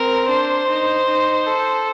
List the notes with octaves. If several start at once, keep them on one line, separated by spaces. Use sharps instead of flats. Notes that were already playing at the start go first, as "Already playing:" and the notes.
Already playing: C4 A#4
D4 C5
D#4
D#4
A4